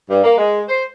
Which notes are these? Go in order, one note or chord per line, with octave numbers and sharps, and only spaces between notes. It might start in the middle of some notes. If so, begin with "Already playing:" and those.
G2
A#3
G#3
C5